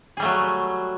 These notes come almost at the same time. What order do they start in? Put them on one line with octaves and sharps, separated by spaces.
G#4 G3 A3 F#3